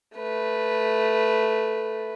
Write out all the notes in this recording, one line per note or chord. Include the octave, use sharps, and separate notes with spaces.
A3 B4